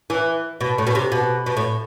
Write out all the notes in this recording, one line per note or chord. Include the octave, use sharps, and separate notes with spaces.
E3
B2
A2
B2
C3
B2
B2
A2